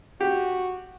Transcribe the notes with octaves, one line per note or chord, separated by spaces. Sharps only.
F#4 G4